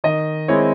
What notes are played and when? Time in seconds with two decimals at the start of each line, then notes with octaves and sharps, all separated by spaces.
0.04 D#3 D#5
0.48 G#3 C4 E4 C#5